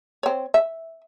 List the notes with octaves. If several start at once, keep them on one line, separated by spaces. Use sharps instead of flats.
C4 C#5
E5